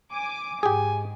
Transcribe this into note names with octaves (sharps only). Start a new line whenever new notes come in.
G#5 D6
G#2 G4 G#4 G#5